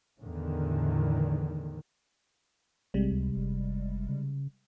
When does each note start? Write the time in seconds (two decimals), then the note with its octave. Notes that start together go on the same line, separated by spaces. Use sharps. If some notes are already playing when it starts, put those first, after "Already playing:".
0.21 E2 A2 D3 D#3
2.94 A#1 C3 G3 G#3
3.12 C#2
3.36 F#1
4.09 C#3